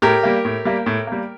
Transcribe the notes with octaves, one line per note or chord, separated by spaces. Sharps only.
A2 G4 A#4
G3 A#3
A2
G3 A#3
A2
G3 A#3